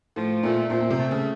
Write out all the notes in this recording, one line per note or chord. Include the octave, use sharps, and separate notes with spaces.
A2 F3
A#2 A3
A#2 C4
A#2
C3
A3
C#3